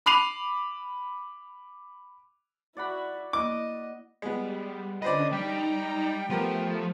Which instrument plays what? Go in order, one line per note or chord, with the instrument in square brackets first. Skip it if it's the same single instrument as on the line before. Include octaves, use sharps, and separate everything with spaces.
[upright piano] B5 D6 C7 D#7 F7
[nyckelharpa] E4 F#4 [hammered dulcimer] D5 F#5 B5
[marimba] A#3 E4 [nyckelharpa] D#5 [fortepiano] D6
[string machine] G3 [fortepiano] G#3 B3
[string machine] D3 C#4 D4 [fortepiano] B4 C5 D5 [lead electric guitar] D#5
[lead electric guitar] G3 [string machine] D#4 A#5 [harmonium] G5
[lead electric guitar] F3 [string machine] A3 [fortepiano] B3 G4 A#4